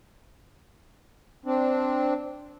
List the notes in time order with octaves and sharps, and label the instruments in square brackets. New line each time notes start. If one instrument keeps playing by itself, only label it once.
[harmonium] C4 D4